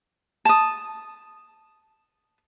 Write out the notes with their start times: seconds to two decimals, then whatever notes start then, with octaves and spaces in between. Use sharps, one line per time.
0.45 A5 D#6